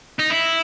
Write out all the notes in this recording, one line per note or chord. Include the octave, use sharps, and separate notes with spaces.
D#4
E4